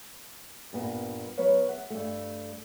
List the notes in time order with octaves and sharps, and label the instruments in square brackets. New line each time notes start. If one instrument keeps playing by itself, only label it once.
[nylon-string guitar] G2 A#2 B3
F#3 B3 B4 C#5 F5
E5 F#5
G2 A3